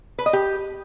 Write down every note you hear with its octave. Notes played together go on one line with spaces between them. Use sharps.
B4
D#5
G4